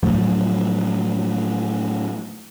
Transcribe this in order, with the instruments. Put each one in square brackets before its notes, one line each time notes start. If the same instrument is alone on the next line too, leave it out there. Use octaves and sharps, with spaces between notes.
[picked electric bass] A2 F3 F#3 A3